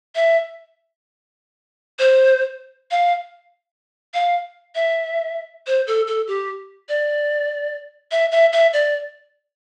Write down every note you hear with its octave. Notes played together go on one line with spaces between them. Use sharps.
E5
C5
F5
F5
E5
C5
A4
A4
G4
D5
E5
E5
E5
D5